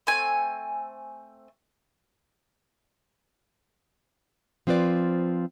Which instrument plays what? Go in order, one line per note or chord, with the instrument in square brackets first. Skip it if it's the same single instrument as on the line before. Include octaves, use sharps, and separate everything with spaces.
[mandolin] A3 C4 G#5
[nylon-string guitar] F3 C4 F4 B4 D5